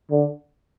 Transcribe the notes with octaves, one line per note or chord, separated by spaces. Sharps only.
D3